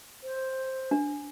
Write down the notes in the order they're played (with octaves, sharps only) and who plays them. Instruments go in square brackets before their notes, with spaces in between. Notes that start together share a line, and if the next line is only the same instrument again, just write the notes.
[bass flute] C5
[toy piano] D4